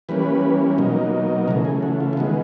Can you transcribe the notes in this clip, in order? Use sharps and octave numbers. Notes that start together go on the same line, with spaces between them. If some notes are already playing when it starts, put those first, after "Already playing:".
E3 G3 A#3 C#4 B4
B2 F#3 A#3 D#4
C#3 E3 A3 A#4
G#4
F#4
F4
F4
D#3 G#3 B3 F#4